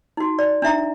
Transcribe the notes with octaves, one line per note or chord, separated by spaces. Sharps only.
D#4 F#4
D5
D4 D#4 E5 A#5